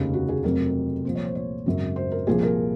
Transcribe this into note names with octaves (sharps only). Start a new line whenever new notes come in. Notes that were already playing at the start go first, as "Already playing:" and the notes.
Already playing: F1 D#2 C#3
F#4
G#4
F1 F2 C3 F#3 A#4
C2 A#2 F3 C5
C#5
C5
C#5
G#1 F#2 C#3 F#3
C5
A#4
C2 A#2 F3 G#4
A#4